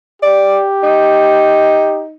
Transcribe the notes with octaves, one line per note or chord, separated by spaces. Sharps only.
G4 D5
D#4